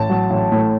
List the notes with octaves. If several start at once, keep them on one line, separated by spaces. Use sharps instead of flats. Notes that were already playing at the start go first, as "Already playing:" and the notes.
Already playing: A1 A5
F#3
A1
A2